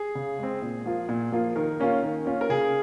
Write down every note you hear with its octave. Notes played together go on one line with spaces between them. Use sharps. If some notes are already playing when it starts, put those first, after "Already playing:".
Already playing: G#4
C#3
G#3 C4
A#2
F3 A#3 F4
A#2
F3 A#3 F4
D#3 A#4
A#3 C#4 F4
D#3
A#3 C#4 F4
A#4
C#3 G#4